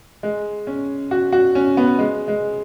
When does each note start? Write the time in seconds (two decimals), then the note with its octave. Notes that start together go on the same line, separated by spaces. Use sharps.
0.23 G#3
0.67 C#4
1.11 F#4
1.32 F#4
1.55 C#4
1.77 B3
1.99 G#3
2.28 G#3